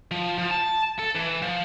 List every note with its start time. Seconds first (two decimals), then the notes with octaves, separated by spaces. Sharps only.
0.11 F3
0.38 F3
0.51 A5
0.99 A4
1.15 E3
1.42 F3